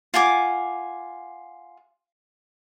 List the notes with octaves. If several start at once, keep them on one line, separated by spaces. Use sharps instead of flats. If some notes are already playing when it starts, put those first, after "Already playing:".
F4 F#5 G#5 D6